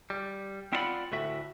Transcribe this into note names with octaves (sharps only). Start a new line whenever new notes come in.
G3
C4 E4 F4 D5 F#5 B5
D2 A2 F#4 E5